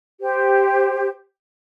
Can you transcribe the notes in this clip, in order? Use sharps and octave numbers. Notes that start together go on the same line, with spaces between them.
G4 C5